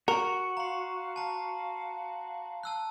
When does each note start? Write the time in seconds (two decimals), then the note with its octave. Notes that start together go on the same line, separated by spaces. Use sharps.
0.08 F#4 A#4 C#7
0.57 F5 A#5 C6
1.16 A5 A#5
2.63 A5 E6 F#6